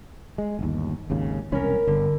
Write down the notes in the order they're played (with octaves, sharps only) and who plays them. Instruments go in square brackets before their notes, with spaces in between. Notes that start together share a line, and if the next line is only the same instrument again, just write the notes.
[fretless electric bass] G#3
G1 D#2
G#1 D#2 C#3
[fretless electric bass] E1 C2 C#4 [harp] A#4 B5
[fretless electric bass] G1 [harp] D3